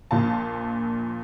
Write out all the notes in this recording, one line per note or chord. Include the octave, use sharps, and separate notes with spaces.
A#1 A#2 F5 A5